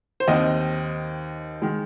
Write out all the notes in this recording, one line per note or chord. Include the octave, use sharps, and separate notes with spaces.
C5
D#2 D#3 C4 D#5
D#3 G#3